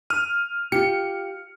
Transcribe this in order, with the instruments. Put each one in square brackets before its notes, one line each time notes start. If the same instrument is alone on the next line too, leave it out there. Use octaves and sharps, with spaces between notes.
[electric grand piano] F6 D#7
[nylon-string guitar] F4 G4 [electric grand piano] C#7